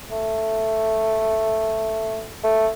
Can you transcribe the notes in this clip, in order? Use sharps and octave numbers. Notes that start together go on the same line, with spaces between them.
A3
A3